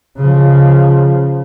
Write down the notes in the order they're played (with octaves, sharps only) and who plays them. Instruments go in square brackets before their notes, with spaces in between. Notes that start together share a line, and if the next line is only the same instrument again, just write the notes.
[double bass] C#3 F3